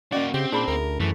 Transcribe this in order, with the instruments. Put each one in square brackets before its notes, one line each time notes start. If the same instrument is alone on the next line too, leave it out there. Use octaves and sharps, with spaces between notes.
[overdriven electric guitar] A#3 F#4 [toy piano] C#4 D#5 F#5 [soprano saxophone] D5
[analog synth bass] C#3 [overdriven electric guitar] C4 [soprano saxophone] G4
[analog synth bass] A#2 [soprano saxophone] D4 [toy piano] D#4 G#4 B5
[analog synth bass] D2 [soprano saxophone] A#4
[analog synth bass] F#2 [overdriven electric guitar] E3 [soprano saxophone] A3